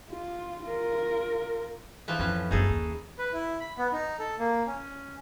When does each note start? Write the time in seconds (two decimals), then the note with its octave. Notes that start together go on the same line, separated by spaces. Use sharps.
0.10 F4
0.63 F4 A#4
2.08 E3 F3 B4
2.19 F2 A2 C#4 B4
2.51 F#1 C4 D#4 G#4 A4
2.69 D#2
3.19 B4
3.33 E4
3.60 B5
3.78 B3
3.92 D#4
4.19 A4
4.39 A#3
4.67 C#4